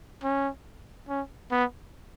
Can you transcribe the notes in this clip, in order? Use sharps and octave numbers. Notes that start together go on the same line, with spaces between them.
C#4
C#4
B3